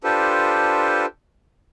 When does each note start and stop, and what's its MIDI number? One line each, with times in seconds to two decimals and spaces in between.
0.04 1.06 62
0.04 1.06 65
0.04 1.06 67
0.04 1.06 69
0.04 1.06 71
0.04 1.06 72